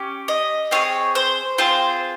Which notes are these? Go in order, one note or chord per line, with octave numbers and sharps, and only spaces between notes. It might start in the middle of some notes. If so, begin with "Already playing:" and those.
Already playing: C#4 G4
D#5
C4 F4 G#4 C#5
C5
C4 F4 G#4 C5